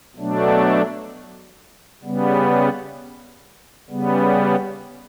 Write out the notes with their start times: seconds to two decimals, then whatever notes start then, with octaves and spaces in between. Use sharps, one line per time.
0.16 B2 F#3 A3 D4
2.03 C#3 G3 B3
3.90 C#3 G3 B3